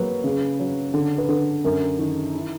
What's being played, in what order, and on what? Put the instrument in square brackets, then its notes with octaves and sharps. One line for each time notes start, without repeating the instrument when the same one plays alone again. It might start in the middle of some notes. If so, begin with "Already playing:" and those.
Already playing: [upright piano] F#3 A#3 [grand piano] B4
[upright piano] C#3
F#3
D3
[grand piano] B4
[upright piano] D3
[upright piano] F#2 [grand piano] A#4
[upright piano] D#3
E4